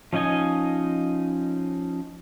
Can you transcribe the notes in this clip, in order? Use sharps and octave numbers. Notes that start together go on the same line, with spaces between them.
F3 C#4 D#4 D#5 G#5